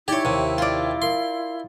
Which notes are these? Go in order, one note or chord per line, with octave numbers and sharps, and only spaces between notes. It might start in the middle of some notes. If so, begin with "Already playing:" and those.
D#4 E4 G4 C#5 D5 G#6 G7
D#2 C3
F4 D5
A#4 F5 C6 C7